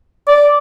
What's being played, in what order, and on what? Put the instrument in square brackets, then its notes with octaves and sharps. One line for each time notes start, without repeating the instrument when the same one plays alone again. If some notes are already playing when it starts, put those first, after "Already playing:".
[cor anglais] D5